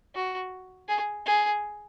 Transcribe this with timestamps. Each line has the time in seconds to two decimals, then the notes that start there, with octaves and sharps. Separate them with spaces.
0.14 F#4
0.88 G#4
1.26 G#4